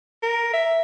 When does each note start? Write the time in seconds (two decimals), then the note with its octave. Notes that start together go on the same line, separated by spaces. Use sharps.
0.23 A#4
0.54 E5